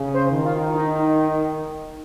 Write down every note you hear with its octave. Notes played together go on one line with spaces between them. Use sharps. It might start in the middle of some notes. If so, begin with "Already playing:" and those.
Already playing: C#3
C5
D#3
F4
D#4